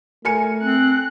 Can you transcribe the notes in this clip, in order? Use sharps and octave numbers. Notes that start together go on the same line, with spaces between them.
A3 A#4 G#5 C#7
C4 F#6